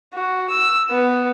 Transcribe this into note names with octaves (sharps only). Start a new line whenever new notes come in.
F#4
E6
B3